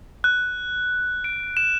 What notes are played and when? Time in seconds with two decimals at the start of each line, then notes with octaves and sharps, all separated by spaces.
0.24 F#6
1.24 D7
1.57 E7